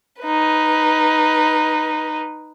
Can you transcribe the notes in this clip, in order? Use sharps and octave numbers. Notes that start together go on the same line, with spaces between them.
D#4 B4